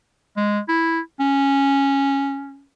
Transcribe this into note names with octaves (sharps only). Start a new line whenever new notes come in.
G#3
E4
C#4